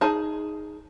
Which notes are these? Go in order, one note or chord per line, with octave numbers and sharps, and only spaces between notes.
D#4 G#4 A5